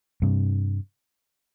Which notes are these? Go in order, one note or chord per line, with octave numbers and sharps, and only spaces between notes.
G2 C3